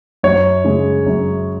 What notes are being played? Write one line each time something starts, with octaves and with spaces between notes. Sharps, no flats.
F#2 C#5
C#3 G#3
F#2